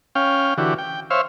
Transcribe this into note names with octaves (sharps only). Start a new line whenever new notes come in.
C#4 F5 G5
D3 E3 F#4 G4
G5
C5 C#5 E5 F5